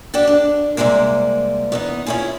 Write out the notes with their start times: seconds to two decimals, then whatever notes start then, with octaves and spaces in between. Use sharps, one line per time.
0.14 D4 F#4 G4 A4
0.27 D4
0.77 C3 F3 G3 G#3 A#3
1.72 E2 B3 D#4
2.06 C#4 D4 E4 F4 G#4